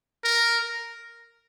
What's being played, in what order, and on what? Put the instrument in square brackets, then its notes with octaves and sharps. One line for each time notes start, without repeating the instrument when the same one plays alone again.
[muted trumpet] A#4